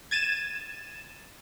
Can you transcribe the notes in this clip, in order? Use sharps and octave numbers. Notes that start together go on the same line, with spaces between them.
G#6 A6 D#7 E7